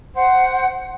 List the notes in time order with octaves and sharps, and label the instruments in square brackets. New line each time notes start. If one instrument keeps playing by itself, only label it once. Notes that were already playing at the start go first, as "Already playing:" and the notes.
[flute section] C5 F#5